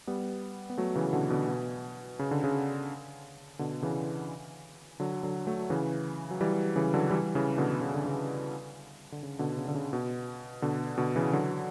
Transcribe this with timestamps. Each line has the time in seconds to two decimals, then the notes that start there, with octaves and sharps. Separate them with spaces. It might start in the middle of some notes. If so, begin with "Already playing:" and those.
0.07 G3 B3
0.70 B3
0.78 F#3 A3
0.95 C#3 E3
1.13 B2 D3
1.30 B2 D3
1.48 B2
2.19 C#3
2.31 D3
2.44 C#3
3.59 B2 D3
3.82 C#3 E3
5.00 D3 F#3
5.23 D3 F#3
5.47 F#3 A3
5.70 C#3 E3
6.31 F#3
6.41 E3 G3
6.76 C#3 E3
6.94 D3 F#3
7.11 E3 G3
7.35 C#3 E3
7.58 B2 D3
7.81 C#3
7.94 D3
8.06 C#3
9.12 D3
9.23 C#3
9.39 B2 D3
9.57 C#3
9.68 D3
9.75 C#3
9.93 B2
10.62 B2 D3
10.98 B2 D3
11.16 C#3 E3
11.33 D3 F#3